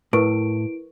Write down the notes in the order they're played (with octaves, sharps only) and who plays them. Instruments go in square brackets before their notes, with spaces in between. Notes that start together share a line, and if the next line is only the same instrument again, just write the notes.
[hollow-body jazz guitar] A2 [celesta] E4 D7 [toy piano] A#4 B4 C#6